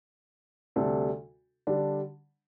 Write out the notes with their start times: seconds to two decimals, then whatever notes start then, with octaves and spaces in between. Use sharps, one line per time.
0.76 D2 C3 G3 D4 A4
1.67 D3 G3 D4